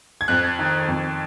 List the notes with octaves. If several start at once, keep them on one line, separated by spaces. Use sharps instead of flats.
G#6
F2 F#6
D#3
F2